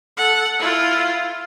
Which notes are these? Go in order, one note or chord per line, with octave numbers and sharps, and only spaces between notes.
A4 F#5
E4 F4